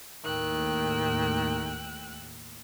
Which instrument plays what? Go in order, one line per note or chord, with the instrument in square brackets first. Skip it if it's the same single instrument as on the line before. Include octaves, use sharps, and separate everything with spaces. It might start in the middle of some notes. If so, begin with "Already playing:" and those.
[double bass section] D#2 A2 [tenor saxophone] D#3 [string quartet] G5 E6 F#6